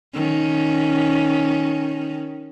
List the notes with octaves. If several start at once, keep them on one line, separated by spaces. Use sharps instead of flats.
D#3 C#4